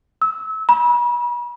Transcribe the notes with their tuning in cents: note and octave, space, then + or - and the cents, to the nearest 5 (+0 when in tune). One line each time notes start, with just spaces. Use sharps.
E6 -25
B5 -40